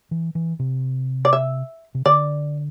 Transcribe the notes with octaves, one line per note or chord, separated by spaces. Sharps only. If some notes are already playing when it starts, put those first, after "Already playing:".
E3
E3
C3
D5
E5
C3
D3 D5